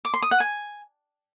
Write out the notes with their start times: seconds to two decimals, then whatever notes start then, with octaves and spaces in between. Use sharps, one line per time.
0.05 D6
0.14 C6
0.22 D#6
0.31 F#5
0.40 G#5